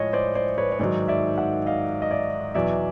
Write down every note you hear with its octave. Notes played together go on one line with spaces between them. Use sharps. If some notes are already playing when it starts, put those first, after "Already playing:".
Already playing: A2 F3 G#3 C#5 D#5
C5 D5
C5 D5
B4 C#5
C#5
G#2 D#3 F#3 C5 D5
D5 E5
E5 F#5
D#5 F5
D#5
D5 E5
E2 B2 F#3 D5 E5